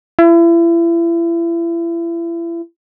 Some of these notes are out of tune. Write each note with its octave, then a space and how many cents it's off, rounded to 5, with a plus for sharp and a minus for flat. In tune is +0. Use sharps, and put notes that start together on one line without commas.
E4 +35